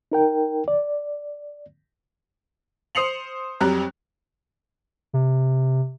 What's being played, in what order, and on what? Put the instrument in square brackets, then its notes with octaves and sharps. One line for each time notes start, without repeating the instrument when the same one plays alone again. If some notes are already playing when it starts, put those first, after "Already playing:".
[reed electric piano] D#4 A#4 G5
D5
[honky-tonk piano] C5 D#6 C7 C#7 F7 F#7
F2 F#3 G3 G4 A#5 F#6
[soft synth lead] C3